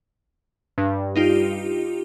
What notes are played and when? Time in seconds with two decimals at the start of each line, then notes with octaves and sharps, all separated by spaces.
0.78 G2
1.16 D#4 F4 G4